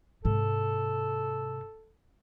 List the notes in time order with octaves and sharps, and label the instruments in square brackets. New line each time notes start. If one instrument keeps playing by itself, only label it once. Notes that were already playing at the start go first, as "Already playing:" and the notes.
[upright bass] G#2 C3 [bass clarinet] A4